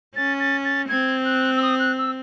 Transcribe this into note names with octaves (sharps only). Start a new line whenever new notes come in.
C#4 A6
A6
A6
C4 G#6
F#6
E6
D#6
F#6
E6